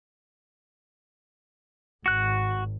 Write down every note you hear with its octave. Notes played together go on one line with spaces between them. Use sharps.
G#1 F#4 F#6